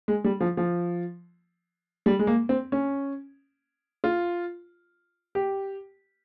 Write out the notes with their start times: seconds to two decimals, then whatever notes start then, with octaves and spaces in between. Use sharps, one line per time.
0.08 G#3
0.24 G3
0.41 F3
0.57 F3
2.06 G3
2.19 G#3
2.27 A#3
2.49 C4
2.72 C#4
4.04 F4
5.35 G4